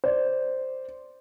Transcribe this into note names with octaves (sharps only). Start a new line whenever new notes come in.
C5 D5